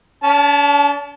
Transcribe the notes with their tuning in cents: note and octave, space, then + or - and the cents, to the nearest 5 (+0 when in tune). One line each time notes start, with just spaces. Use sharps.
C#4 +45 A5 -15